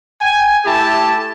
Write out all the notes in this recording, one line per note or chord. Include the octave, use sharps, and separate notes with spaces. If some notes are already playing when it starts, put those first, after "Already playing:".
G5 G#5
A3 E4 G4 G5 A5